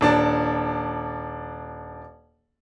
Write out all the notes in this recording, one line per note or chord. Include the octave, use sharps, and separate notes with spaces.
D#1 D4 A5